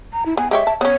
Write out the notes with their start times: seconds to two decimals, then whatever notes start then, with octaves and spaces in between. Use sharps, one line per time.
0.13 A#5
0.26 E4
0.37 B3 G#5
0.51 G#3 G4 C#5 E5
0.67 A5
0.81 B3 C#4 C#5